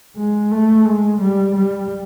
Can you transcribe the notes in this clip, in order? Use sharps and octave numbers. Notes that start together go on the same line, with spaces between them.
G#3
A3
G#3
G3
G3